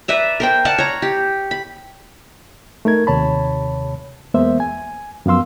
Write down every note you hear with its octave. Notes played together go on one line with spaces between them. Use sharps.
B4 D5 E5 A#5
A#4 C5 G5
D5 F5 F#5 A5
C#5 A#5
G4
B5
A3 D#4 A#4 G#6
D#2 C3 C#5 A5 B5
E2 G#3 A#3 B3 C5 E5
G#5
F#2 F3 B3 F5 C6 E6